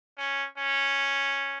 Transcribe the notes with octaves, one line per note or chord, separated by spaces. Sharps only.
C#4
C#4